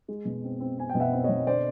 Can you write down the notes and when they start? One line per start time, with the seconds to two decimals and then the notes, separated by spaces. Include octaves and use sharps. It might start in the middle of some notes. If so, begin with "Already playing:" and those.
0.08 G#3
0.25 B2
0.44 C4
0.60 C4
0.78 C4 G#5
0.89 G5
0.95 B2
1.00 E5 F#5
1.13 C4
1.24 B2 C#5 D#5
1.46 D3 C5 D5